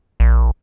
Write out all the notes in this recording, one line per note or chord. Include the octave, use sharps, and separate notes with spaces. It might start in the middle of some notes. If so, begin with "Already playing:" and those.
A#1